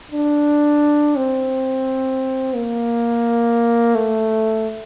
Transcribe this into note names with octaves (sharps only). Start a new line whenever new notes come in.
D4
C4
A#3
A3